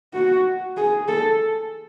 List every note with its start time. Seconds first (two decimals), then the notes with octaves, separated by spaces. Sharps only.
0.14 F#4
0.77 G#4
1.08 A4